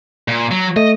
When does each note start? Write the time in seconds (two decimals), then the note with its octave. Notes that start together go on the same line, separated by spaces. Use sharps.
0.28 A#2
0.51 F#3
0.76 A3 D#5